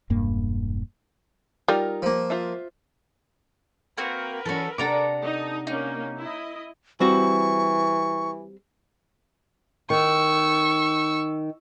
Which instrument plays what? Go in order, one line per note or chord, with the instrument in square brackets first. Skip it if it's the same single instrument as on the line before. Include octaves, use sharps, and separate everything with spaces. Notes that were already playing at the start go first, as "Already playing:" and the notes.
[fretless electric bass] E1 G2 A#3
[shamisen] G3 [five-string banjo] D#4 F4 A#4
[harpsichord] F3 A#3
[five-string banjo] F4 C5 E5
[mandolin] A#3 C4 F#4 [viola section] A#4 B4
[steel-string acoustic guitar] E3 C#4 [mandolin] F#4 A4
[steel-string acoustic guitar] C3 D4 F#5 [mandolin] A4 A#5 D6
[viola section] D#4
[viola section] A#3 C#4 [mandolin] D#4
[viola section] E4 D#5
[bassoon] E3 [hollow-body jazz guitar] G3 C4 F#4 [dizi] C#6
[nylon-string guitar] D#3 [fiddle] C#6 E6